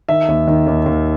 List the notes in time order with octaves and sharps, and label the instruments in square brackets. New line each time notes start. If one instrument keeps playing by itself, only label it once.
[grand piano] D#3 E5
D#2
D#3
D#2
D#2